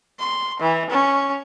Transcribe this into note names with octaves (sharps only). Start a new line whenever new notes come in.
C6
E3
C#4